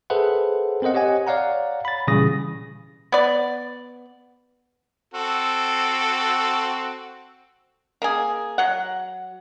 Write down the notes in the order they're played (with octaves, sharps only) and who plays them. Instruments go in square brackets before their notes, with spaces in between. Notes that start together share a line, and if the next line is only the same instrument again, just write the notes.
[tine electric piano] G#4 A4 B4 C5 E5 F#5
C4 A#4 C5 D#5 F#5
G4 C#5 D#5 F#5 G#5
C#5 D5 F5 F#5 A#5
B5 A6
A#2 C#3 E3 G3 D#6 A#6
[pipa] B3 D5
[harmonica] C4 F#4 A4
[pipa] A#3 G#4
F#3 F#5